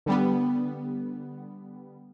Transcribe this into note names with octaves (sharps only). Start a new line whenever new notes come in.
D3 G3 B3